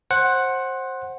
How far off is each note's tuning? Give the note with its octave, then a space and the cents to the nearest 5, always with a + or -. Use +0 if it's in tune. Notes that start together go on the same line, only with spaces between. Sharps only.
C5 +20 F#5 +0